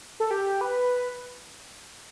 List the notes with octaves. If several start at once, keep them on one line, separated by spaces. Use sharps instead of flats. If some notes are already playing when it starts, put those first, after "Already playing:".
A4
G4
B4